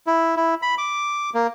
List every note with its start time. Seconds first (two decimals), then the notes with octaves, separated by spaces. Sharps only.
0.07 E4
0.36 E4
0.62 B5
0.78 D6
1.34 A#3